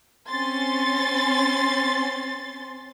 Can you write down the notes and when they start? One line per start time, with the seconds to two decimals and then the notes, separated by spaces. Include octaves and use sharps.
0.28 C4 C#4 C6 A6